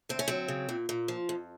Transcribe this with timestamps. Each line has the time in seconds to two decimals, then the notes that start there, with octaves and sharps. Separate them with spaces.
0.09 D2 C4
0.19 C#4
0.28 F#3 C4
0.48 C#3
0.69 A#2
0.89 A#2
1.08 F3
1.29 F2